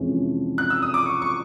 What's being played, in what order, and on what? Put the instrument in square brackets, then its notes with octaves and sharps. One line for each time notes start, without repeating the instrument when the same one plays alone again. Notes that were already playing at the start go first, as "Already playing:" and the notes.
Already playing: [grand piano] F2 C3 E3 G#3 C#4
[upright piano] F#6
E6
D#6
D6
C#6
C#6